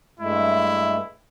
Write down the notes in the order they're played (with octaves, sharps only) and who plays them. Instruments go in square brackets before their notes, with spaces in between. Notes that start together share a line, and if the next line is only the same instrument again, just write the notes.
[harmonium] G2 G#3 A3 [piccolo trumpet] E4